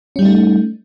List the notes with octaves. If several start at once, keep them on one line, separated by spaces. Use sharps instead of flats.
G3 A3 C#4 D#4